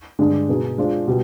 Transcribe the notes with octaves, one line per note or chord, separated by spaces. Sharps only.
G2 D3 G#3 D4
B2 B3 D#4 G#4
G#3 D4 F4 G#4 C5
B2 G3